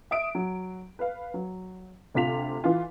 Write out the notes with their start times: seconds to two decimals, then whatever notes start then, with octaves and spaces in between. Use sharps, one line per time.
0.11 E5 D#6 D7
0.35 F#3
0.99 B4 F5
1.34 F#3
2.14 D2 C3 F4 B6 F7
2.64 E3 F4